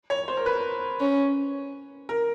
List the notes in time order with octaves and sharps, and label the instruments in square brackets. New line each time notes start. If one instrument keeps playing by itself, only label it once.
[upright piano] C#5
C5
A#4
B4
[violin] C#4
[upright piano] A#4